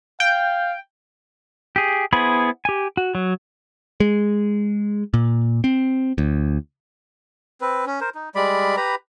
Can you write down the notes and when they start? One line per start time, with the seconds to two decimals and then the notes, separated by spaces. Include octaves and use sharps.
0.20 F5 G5
1.76 G4 G#4
2.13 B3 E4 G#4 C5 B5
2.65 G4 G#5
2.97 F#4
3.15 F#3
4.00 G#3
5.14 A#2
5.64 C4
6.18 D2
7.61 C4 B4
7.86 C#4
8.01 A#4 C5
8.15 D#4
8.35 G3 G#3 D5 B5
8.77 G4 B4 A#5 B5